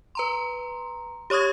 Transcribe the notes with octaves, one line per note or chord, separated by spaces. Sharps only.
B4 A#5 C6
G4 C#5 C#6 D#6 G#6